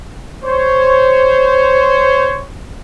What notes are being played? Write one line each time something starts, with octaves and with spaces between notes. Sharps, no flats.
C5 C#5